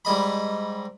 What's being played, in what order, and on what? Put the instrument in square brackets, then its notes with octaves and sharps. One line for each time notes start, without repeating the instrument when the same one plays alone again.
[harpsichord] G#2 G3 D#5 B5